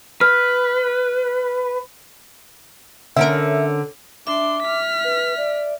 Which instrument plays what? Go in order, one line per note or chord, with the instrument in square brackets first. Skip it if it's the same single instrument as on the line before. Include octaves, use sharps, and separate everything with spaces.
[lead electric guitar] B4 [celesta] F6
[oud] D3 C#4 A#4 [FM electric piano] E5
[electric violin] D4 C6 [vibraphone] E5 [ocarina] D6
[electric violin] F6 B6
[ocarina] B4
D5